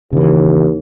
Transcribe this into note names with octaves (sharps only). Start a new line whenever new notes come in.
D#2 C#3 E3